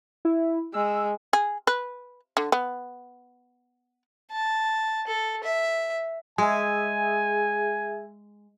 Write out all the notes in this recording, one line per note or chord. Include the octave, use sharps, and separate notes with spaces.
E4
G#3 E6
G#4
B4
D3
B3
A5
A4
E5
G#3 G#4 E5 G#5